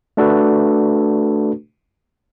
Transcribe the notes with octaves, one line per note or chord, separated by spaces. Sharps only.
A3 D4 F#4 A4 B4